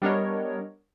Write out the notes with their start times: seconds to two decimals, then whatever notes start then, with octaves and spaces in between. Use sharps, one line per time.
0.02 G3 B3 D4 A#4 C#5 D#5